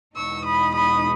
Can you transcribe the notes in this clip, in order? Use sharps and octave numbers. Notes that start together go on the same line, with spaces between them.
E2 B2 G#3 D#4 C#6 E6
B5 D#6
B5 D#6